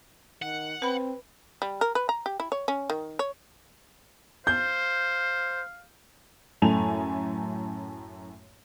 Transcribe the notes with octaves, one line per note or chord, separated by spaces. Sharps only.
D#3 F#5
C4 B4 B5
G3
A#4
B4
A#5
G4
E4
C#5
C#4
D#3
C#5
C5 F5 G6
F#2 A2 A3 G#5 F7